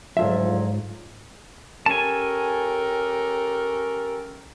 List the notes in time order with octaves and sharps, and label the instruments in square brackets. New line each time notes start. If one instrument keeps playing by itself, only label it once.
[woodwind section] D2 F3 F#3 [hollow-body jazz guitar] G#2 F4 E5
[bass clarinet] C#4 [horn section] G4 A4 A#4 [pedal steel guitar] G#5 A5